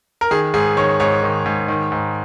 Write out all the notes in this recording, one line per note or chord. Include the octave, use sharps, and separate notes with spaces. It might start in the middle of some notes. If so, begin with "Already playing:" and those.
A#4
D#3 G#4
G#2 G#4
D#3 C#5
G#2 C#5
D#3
G#2
D#3
G#2